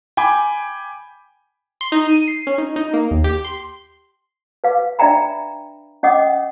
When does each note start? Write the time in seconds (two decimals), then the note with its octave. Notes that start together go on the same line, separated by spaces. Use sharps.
0.17 G5 G#5 B5 D6
1.81 C6
1.92 D#4
2.08 D#7
2.28 C7
2.47 C#4
2.58 D#4
2.76 D#4
2.93 A#3
3.11 D#2
3.24 G4
3.45 C6
4.64 B4 F5 D6
4.99 D4 D5 E5 G5 A#5 B5
6.03 C#4 D#5 F#5 D6 D#6